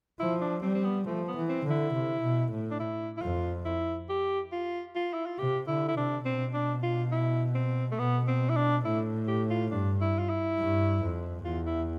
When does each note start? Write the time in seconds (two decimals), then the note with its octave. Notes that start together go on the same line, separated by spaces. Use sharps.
0.20 F3 E4
0.41 D4
0.62 G3 C4
0.74 C4
0.84 B3
1.06 F3 A3
1.28 B3
1.35 E3
1.49 C4
1.64 D3
1.70 E4
1.93 C3
2.21 B2
2.51 A2
2.71 D4
2.80 E4
3.17 E4
3.22 F2 F4
3.65 E4
4.09 G4
4.52 F4
4.96 F4
5.14 E4
5.26 F4
5.39 C3 G4
5.68 D3 E4
5.88 E4
5.96 C3 D4
6.25 B2 C4
6.54 D4
6.83 F4
7.12 E4
7.55 C4
7.92 A3
7.98 B2 B3
8.28 C4
8.49 E4
8.56 D4
8.85 A2 E4
9.28 G4
9.50 F4
9.71 G2 D4
10.01 E4
10.19 F4
10.29 E4
10.59 G2
11.02 F2
11.45 E2 F4
11.67 E4